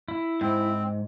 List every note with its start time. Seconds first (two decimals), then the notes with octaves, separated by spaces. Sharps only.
0.08 E4
0.41 G#2 C4